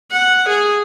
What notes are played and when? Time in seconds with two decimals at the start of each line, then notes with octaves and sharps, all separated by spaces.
0.11 F#5
0.49 G#4